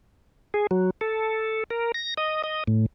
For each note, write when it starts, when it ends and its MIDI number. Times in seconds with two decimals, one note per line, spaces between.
0.54 0.67 68
0.71 0.90 54
1.01 1.64 69
1.70 1.92 70
1.94 2.14 94
2.17 2.42 75
2.44 2.64 75
2.67 2.86 45